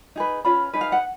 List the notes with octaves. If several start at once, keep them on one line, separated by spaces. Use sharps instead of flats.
D#4 G#4 B4
C#4 F4 B4 B5
D#4 G#4 B4
F5
F#5